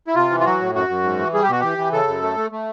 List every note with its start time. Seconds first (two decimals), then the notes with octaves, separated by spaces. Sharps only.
0.07 E4
0.15 C3 F4
0.30 E3
0.40 F4
0.45 F#3 F#4
0.60 A2
0.74 F#2 F#4
0.89 F#2
1.03 G#2
1.19 E3
1.34 G3 G#4
1.42 G4
1.49 B2 F#4
1.60 E3 G4
1.78 E3
1.92 C#3 A4
2.08 F#2
2.22 A3
2.37 A3
2.52 A3